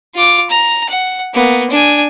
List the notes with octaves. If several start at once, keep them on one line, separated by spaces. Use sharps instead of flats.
F4 D6
A#5
F#5
A#3 B3
D4 G#5